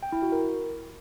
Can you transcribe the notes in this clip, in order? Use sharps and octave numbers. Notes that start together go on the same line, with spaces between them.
G5
E4
F#4
A#4